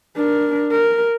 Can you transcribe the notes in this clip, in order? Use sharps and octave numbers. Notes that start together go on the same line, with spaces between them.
D4 A#4
A#4